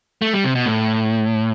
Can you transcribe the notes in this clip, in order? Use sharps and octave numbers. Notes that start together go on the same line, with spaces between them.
A3
G3
C3
B2
A2